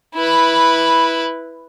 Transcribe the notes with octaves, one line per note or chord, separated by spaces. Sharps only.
E4 B4